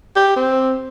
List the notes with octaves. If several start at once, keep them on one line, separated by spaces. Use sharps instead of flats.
G4
C4